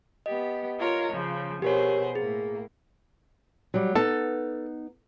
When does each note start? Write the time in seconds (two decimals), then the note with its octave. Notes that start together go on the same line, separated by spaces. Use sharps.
0.26 B3 G4 D#5
0.78 F4 A#4 C#5
1.12 C#3 F3
1.62 B2 G4 G#4 A#4 C5 C#5
2.15 A2 A#3 G#4
3.74 F#3 G3
3.95 B3 D#4 A4